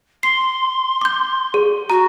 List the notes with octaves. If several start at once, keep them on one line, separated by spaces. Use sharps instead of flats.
C6 C7
D6 G6
G#4
F#4 A#5